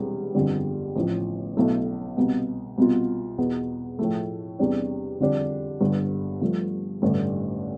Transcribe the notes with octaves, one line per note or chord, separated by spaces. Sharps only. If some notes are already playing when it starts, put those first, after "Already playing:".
Already playing: E1 E2 C3 G3 B3
G1 F2 D3 G3
A1 A2 F3
B1 B2 A3 E4
C2 B2 B3
C2 B2 B3 F4
E2 B2 B3
A2 F3 A3
E2 C3 G3 D4
F2 D3 G3 D4
G1 G2 D3
G2 F3 A3
A1 G2 D3 A3 D4